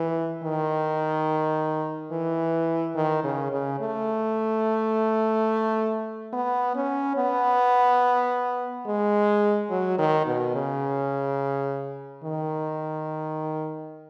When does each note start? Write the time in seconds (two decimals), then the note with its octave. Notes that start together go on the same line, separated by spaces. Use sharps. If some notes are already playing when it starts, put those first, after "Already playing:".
Already playing: E3
0.43 D#3
2.12 E3
2.95 D#3
3.24 C#3
3.52 C#3
3.80 A3
6.33 B3
6.75 C#4
7.17 B3
8.86 G#3
9.70 F#3
9.98 D#3
10.26 B2
10.55 C#3
12.24 D#3